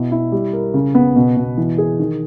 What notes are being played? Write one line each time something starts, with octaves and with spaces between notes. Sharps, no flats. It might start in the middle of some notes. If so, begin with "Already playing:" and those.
Already playing: B2 E4
E4
G3
A#4
C#3
B3
B2
B2
E3
G#4
D#3